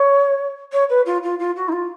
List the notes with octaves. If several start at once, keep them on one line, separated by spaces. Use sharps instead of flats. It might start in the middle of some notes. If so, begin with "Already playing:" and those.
Already playing: C#5
C#5
B4
F4
F4
F4
F#4
D#4
F4